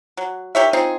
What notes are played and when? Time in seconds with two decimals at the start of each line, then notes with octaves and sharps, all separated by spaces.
0.17 F#3
0.55 D#3 G4 C#5 E5
0.73 C4 D#4 F4 G#4